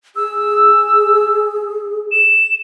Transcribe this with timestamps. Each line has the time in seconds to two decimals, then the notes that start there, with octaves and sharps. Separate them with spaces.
0.16 G#4 E6
2.11 E7